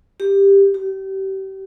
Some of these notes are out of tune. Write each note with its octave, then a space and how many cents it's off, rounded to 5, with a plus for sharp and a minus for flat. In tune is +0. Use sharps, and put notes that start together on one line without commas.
G4 +10
G4 -30